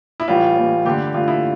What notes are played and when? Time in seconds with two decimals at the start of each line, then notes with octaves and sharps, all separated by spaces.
0.20 E4
0.28 A2 E3 G3 F4
0.56 A2 E3 G3
0.85 G2 D3 A3 G4
1.14 G2 D3 A3 F4
1.28 E4